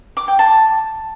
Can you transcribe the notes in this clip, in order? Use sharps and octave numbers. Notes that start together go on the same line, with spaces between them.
D6
G5
A5